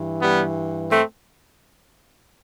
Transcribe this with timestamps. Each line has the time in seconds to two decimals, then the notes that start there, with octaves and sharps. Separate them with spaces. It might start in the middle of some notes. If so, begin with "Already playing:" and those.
Already playing: G2 E3
0.22 G3 B3
0.90 A3 C4